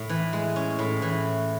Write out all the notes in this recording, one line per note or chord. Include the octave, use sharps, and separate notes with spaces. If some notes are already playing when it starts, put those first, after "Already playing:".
Already playing: A2
E3
G#3
C#4
A2
E3